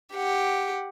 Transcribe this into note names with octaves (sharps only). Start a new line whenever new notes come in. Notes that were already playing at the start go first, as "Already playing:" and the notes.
G4 F#5